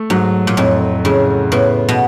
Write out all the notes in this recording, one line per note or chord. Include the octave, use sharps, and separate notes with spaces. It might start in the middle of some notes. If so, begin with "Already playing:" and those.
Already playing: A3
G#2 F#3
A#2
F2 A2
A2 C#3
A2 B3
B2